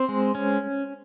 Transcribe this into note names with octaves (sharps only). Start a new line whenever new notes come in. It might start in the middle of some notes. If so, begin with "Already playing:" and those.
Already playing: C4 C5
G#3
C#4